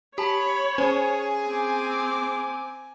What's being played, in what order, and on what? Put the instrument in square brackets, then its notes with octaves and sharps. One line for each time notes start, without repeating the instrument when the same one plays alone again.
[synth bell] G4 G#5 A5 [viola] C#5 [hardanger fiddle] B5
[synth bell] C#4 C5 B5 [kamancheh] G#4 [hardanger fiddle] G#5
[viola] C4 D6